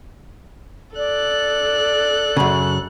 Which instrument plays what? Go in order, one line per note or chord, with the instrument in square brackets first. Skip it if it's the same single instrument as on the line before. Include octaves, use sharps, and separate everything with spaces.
[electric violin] A4 F#6 [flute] D5
[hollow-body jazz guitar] F#2 C#3